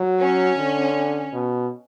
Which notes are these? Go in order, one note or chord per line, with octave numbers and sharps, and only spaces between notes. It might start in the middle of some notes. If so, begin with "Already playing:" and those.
Already playing: F#3
C#4
D3
B2